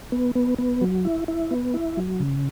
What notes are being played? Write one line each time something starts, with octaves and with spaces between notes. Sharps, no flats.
B3
B3
B3
F#3
E4
E4
B3
E4
F#3
C#3